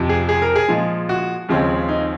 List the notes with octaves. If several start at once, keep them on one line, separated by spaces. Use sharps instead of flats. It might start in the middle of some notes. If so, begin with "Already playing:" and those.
Already playing: F2 C3 F3
G#4
G#4
A#4
G#4
A#2 F3 G#3
F#4
D#2 C#3 F3 G#3 C4
D#4